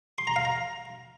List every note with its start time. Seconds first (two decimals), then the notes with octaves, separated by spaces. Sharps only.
0.18 C6
0.27 A#5
0.36 F5
0.45 A#5